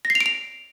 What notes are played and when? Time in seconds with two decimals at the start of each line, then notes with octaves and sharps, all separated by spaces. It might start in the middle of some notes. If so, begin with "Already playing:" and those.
0.05 A#6
0.10 C7
0.15 F7
0.21 D7
0.26 F7